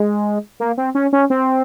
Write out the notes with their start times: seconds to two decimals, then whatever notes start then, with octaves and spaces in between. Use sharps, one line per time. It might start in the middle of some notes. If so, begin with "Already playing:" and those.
Already playing: G#3
0.60 A#3
0.78 C4
0.95 C#4
1.13 C#4
1.30 C4